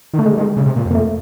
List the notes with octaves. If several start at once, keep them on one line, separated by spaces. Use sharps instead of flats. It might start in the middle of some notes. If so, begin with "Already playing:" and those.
D#3
D3 A3
G#3
G3
D#3
G#3
C#3
C3
A#2
F2
A#3
A3